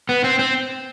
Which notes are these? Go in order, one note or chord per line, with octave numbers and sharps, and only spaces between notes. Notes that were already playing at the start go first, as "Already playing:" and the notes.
B3
C4
C4